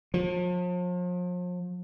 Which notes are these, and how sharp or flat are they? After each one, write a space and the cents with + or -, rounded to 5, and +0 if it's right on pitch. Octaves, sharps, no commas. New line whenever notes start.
F3 +40